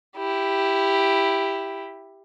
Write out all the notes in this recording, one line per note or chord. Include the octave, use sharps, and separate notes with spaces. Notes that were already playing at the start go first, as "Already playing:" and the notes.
E4 G4